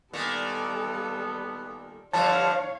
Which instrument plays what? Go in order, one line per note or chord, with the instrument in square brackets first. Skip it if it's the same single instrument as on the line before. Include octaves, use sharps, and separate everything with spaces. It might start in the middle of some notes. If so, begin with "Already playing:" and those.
[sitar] A#2 D#3 [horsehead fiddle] G3 A4 [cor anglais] B3
[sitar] G2 D3 F3 [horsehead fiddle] C#5 F5 [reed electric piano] A5